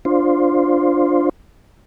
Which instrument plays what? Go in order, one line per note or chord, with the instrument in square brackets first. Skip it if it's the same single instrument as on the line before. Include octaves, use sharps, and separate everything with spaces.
[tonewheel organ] D4 F4 C5